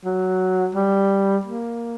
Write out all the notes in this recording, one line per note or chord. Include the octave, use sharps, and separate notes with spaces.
F#3
G3
A#3